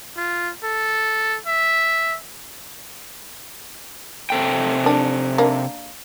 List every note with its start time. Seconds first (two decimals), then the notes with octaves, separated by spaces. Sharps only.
0.17 F4
0.64 A4
1.47 E5
4.30 C3 A4 G5
4.84 A#3 D4
5.38 A#3 D4